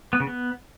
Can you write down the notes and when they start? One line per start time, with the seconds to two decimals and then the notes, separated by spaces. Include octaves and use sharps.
0.13 B3
0.20 C#3
0.27 B3